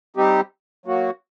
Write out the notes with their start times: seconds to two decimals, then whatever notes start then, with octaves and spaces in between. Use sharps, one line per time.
0.16 G3 C4 D#4 G4
0.86 F#3 A#3 F#4